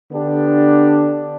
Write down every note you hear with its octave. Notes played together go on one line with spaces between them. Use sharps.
D3 B3 D4 G4